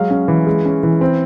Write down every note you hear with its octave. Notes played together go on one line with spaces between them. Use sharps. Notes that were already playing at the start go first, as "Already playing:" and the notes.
Already playing: F#3 G#3 F5
C#4
E3
G#3
C#4
E3
C4